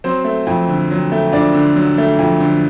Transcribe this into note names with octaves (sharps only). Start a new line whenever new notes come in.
F#3 C4 C5
A3
F2
D3
F#3
A3
F2 D4 D5
D3
F#3
A3
F2
D3